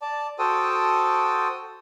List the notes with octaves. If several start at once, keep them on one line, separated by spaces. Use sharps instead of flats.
D5 A5
F#4 A4 C5 G5 A5 D#6